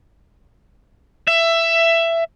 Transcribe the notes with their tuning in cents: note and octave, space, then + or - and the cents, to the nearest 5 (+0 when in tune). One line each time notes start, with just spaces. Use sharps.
E5 +15